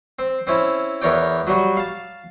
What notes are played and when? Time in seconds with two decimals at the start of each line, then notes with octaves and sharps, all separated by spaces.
0.19 C4
0.47 C4 C#4 E4
1.02 E2 E3 A#4 C#5 D5 G5
1.47 F#3 G3 F#4
1.77 F5 A5